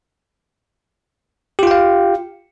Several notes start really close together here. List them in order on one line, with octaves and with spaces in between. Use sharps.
G4 F4 G5 F5